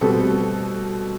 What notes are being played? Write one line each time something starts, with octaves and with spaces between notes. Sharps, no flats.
B2 G3 C4 A4